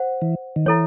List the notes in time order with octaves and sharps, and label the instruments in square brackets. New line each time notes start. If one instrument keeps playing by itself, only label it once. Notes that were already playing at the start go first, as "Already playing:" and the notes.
Already playing: [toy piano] C5 F#5
[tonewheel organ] E3
D#3
[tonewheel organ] E3 [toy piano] E4 A4 C#5